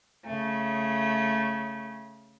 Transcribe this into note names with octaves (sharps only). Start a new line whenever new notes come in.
C#3 A3